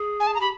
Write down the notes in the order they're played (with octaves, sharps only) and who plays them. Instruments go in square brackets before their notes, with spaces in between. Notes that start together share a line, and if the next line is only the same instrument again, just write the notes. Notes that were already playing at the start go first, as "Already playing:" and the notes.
Already playing: [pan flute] G#4
[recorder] G#5
A5
A#5
[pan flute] G4 [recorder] B5